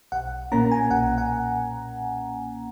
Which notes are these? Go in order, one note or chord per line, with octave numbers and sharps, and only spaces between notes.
B1 F#5
A#2 A#3 C#4 A#5
G#5
B1 F#5
F#5